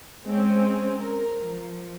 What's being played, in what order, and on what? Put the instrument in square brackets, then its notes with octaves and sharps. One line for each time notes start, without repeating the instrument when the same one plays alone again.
[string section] G#3 C4 C#4
A#4
F3